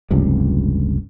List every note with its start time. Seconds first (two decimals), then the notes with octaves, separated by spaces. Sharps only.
0.11 F1 C#2 G2